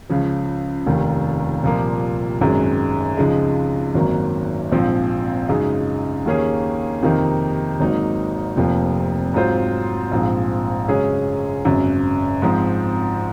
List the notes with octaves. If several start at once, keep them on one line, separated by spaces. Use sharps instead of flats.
C#2 C#3 F3
F1 D#2 D#3
C2 A#2 F3 A#3
G#1 F#2 D#3 G#3
C#2 C#3 F3 G#3 D#4
G#1 F#2 D#3 F#3 A#3
A#1 G#2 F3 C4
F#2 C#3 G#3 D#4
D#2 D#3 A#3 C#4 G#4
F2 C3 D#3 A#3 D#4
G#1 G#2 F#3 A#3 D#4
F1 F2 C3 F3 A#3
G#2 F#3 C4 F4 C5
A#1 G#2 F3 C4
F#2 C#3 G#3 C#4 G#4
G#1 F#2 C#3
G#2 F3 C4